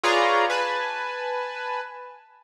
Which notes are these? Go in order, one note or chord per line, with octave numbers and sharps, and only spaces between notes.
F4 G#4 B4 C#5 D5 A#5
B4 G#5 A5